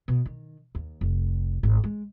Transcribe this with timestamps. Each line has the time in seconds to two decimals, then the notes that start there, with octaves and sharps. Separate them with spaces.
0.08 B2
0.26 D#3
0.75 D#2
1.01 F1
1.63 G#1
1.84 G#3